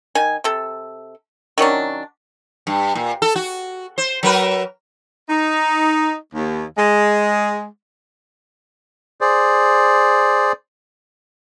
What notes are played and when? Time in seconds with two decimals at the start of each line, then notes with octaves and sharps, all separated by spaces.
0.15 D#3 G#5
0.44 C3 A4
1.58 D#3 F#3 C#4 D4
2.67 G2
2.95 A#2
3.22 A4
3.36 F#4
3.98 C5
4.23 F#3 A#4 B4
5.29 D#4
6.35 D#2
6.78 G#3
9.21 G#4 C5 D5